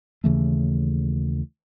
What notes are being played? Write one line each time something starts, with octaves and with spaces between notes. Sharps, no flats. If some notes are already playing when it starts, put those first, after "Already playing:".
D#2 C#3 E3 A3